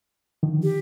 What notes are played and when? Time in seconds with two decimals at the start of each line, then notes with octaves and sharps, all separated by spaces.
0.43 D3 D#3 F3
0.63 G4